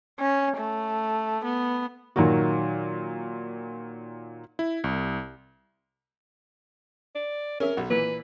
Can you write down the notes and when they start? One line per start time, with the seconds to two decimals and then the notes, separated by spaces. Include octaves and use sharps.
0.20 C#4
0.57 A3
1.45 B3
2.16 A#2 D#3 F#3 A#3 F#4
4.59 E4
4.84 C2
7.15 D5
7.60 C#4 G#4 A#4 E5
7.77 B1 B2 F#5
7.90 A#2 E3 B4